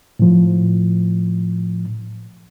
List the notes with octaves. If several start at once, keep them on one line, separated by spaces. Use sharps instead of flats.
A2 F3